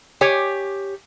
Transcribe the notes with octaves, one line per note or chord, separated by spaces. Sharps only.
G4 C#5 G#5